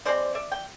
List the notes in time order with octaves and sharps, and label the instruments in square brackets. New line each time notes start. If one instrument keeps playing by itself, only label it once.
[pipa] E3 G#3 C4 C5 D5
D5 E5
G5